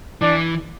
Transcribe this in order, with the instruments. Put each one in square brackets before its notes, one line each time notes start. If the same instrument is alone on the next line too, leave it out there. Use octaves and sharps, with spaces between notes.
[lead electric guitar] E3 [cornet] D4